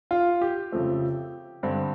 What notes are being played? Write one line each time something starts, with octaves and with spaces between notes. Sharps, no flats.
F4
G4
F2 C#3 F3 A3 C4
G2 D3 G3 C4